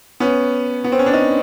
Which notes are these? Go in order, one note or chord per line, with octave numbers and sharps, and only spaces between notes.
B3 C#4
B3
C4
C#4
D4
C#4 D#4